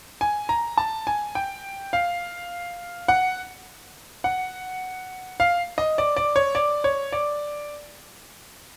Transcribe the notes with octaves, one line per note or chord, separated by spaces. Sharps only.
G#5
A#5
A5
G#5
G5
F5
F#5
F#5
F5
D#5
D5
D5
C#5
D5
C#5
D5